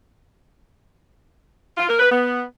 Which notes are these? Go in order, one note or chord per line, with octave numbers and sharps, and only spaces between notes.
F4
A#4
B4
B3